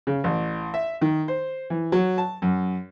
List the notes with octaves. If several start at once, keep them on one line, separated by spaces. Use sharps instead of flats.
C#3
A1
E5
D#3
C5
E3
F#3
A5
F#2